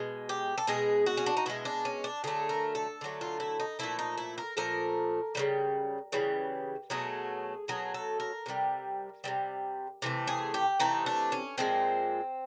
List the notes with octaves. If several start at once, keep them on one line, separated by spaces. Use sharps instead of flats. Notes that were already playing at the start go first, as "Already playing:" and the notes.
Already playing: B2 G#3
G4
A4
B2 G#3 G#4
F#4
C#4
D4
D#4
B2 G#3 E4
D4
C#4
D4
D3 F#3 A3 G#4
A#4
A4
D3 F#3 A3
F4
E4
D#4
A#2 F3 A3 E4
D#4
E4
A#4
A#2 F3 A3 A#4
C#3 E3 G3
C#3 E3 G3
B2 F#3 A3 G#4
B2 F#3 A3 G#4
A4
A#4
C3 E3 G3
C3 E3 G3
C3 E3 A3
G#4
G4
C3 E3 A3 D#4
D4
C#4
A#2 F3 G#3 C4